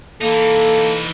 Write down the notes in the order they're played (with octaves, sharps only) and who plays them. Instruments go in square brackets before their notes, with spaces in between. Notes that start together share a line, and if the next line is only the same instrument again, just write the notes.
[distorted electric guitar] E3 D#4 [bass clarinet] A#3 [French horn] A4